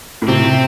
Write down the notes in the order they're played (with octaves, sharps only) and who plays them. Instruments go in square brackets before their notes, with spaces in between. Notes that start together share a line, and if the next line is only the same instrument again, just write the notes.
[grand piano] A2
[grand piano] C3 [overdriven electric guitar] C4
[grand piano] C3